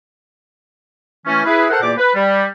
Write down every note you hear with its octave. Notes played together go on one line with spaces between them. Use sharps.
E3 A3 C#4
E4 G#4 B4
A4 A#4 C5 F#5
E2 A#2 A#3 G4 D5 D6
B4
G3